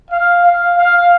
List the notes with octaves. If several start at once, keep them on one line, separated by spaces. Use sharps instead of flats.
F5
F5
F5